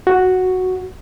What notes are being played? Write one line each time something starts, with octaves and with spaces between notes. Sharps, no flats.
F#4